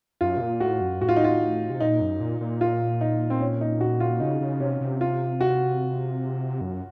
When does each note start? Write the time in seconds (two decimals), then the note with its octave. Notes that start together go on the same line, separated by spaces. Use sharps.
0.21 F#2 F4
0.37 C3
0.41 A#2
0.60 A2 F#4
0.81 F#2
1.01 A2 F#4
1.09 F4
1.16 D#4
1.24 F4
1.70 C3
1.80 A#2 D#4
2.01 F#2
2.20 A#2
2.41 A#2
2.61 F4
3.01 D#4
3.30 C4
3.40 C#4
3.61 D#4
3.81 F#4
4.00 F4
4.20 C#3 D#4
4.41 C#3
4.60 C3 C#4
4.81 C3
5.01 F4
5.41 F#4
6.61 F#2